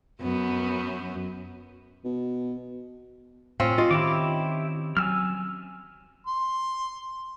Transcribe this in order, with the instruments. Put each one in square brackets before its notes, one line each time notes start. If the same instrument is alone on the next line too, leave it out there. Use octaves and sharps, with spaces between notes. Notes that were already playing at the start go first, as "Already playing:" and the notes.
[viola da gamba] F#2 B3
[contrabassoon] B2
[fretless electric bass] A2 [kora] C4 C#4 F4
[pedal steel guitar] F4 [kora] D#5
[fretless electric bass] D#3 [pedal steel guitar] E4 G4 D6
[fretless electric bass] F#3 [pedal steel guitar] G#5 E6 F6
[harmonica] C6